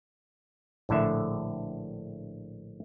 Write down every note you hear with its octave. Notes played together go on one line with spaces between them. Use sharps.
A#1 A2 D3 E5